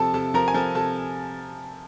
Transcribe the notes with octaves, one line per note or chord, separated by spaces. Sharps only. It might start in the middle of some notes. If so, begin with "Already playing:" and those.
Already playing: C3 F3 A4 A5
C3 A4 A5
F3 A#4 A#5
G#5
F3 A4 A5
C3 A4 A5